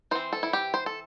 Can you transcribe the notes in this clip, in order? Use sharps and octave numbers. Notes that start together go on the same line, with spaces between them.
E3 C4 C5
A4
E4
G4
C5
A4